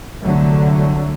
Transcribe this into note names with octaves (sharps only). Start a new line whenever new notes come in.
C2 D3 F#3 A3